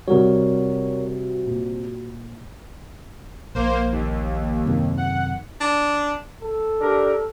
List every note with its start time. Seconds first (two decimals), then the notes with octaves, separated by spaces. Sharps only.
0.08 C3 G3 F#4 A#4 C#5
1.47 A#2
3.55 A#1 A#3 C5
3.92 D#2
4.65 F#2 C3 D#3
4.97 F#5
5.61 D4
6.42 A4
6.81 D4 G4 A#4